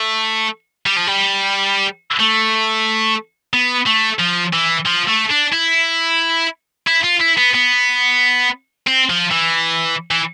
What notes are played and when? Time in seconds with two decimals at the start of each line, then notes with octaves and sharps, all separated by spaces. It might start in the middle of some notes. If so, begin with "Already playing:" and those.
Already playing: A3
0.86 G3
0.97 F3
1.07 G3
2.20 A3
3.53 B3
3.87 A3
4.20 F3
4.53 E3
4.86 F3
5.09 A3
5.31 D4
5.53 E4
6.87 E4
7.03 F4
7.20 E4
7.37 B3
7.54 B3
8.87 C4
9.10 F3
9.31 E3
10.11 E3